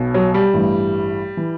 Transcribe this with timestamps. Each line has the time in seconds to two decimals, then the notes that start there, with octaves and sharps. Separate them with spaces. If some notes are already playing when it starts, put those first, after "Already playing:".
Already playing: B1 B2
0.14 F#3
0.34 G3
0.53 A1 G2 E3
1.37 E3